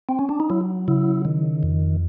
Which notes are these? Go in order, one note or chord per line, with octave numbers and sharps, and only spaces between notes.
C4
C#4
D4
D#4
F#3 E4
C#3 E4
D#3
F2